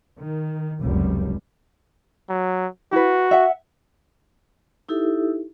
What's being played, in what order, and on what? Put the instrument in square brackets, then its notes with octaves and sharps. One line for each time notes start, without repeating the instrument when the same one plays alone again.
[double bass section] D#3
F1 C#2 F#2 G3
[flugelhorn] F#3
[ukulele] E4 B4 [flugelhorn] F#4
[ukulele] E5 F#5
[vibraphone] D#4 E4 G4 A4 E5